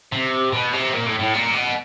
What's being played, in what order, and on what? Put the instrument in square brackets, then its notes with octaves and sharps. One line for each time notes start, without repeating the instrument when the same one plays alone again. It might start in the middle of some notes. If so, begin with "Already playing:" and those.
[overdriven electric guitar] C3
B2
C3
A#2
A2
A2
A#2
B2